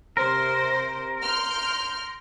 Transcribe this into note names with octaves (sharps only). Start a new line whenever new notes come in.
C3 A#4 C5
C6 F6 G6